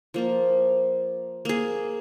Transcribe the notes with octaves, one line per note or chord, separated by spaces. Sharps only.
F3 A#3 F4
A#3 G#4